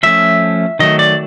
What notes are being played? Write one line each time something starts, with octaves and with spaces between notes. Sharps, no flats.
F3 A3 C#4 E5
D#3 F#3 A3 D#5
D5